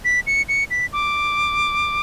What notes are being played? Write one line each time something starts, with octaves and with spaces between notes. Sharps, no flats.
B6
C#7
C#7
B6
D6